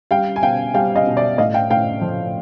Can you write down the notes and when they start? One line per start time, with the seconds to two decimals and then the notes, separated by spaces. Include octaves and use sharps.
0.11 G3 F5 G5
0.36 G#5
0.43 B2 F5 G5
0.74 G3 F5 G5
0.96 D#5 F5
1.07 B2
1.17 D5 E5
1.38 A2 D#5 F5
1.54 F5 G5
1.70 A2 F5 G5
2.01 F3